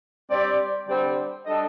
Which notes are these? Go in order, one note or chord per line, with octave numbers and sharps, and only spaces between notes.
G3 C4 G4 D5
D3 G3 C4 G4 D5
G3 D4 A4 D#5